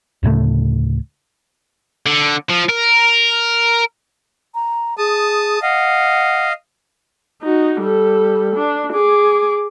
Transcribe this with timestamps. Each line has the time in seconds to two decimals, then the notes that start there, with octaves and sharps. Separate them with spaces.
0.23 D2 A2 C#3 A3
2.06 D3
2.50 F3
2.69 A#4
4.55 A#5
4.98 G#4 A5 D#6
5.62 D#5 F5 F#5
7.43 D#4 F#4
7.81 G3 A4
8.56 D4
8.93 G#4 D6